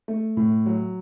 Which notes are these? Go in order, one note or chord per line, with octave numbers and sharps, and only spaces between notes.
A3
A2
F#3